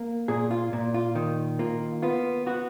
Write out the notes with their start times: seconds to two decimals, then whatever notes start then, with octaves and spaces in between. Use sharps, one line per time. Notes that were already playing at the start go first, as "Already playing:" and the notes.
Already playing: A#3
0.28 A#2 G#4
0.51 F4
0.73 A#2
0.94 F4
1.15 D#3
1.59 A#3 F4
2.02 B3 F4
2.46 B3 F#4